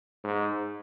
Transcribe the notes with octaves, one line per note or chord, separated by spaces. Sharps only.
G#2